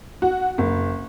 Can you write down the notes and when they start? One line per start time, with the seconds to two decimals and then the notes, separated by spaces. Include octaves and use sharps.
0.22 F#4
0.58 F#1